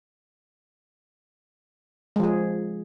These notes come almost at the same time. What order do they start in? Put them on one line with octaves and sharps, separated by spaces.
G#3 F3 G#4